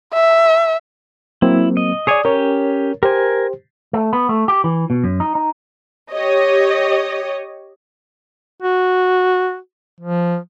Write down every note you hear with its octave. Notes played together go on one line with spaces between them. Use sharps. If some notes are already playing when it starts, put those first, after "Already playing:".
E5
F#3 A#3 C4 E4
D#5
G#4 C#5 D5 G#5 D#6
C#4 G4 A#4 C#5
G4 A#4 C5 G#5
A3
B3
A3
G4
E3
B2
F#2
D#4
D#4
G4 C#5 D#5
F#4
F3